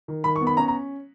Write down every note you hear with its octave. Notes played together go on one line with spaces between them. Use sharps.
D#3
D#3 B5
C#6
B3
B5
C#4 A#5
A#5